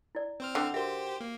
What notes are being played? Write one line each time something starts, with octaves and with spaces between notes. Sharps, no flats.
E4 D5
C4 C5 F6
D3 E5 G5
F#4 G4 A#4 C5 E5
A#3